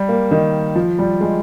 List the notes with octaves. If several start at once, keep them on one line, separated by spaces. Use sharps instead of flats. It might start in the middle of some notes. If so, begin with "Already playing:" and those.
Already playing: G3
A#3
D#3
F3
G3
G#3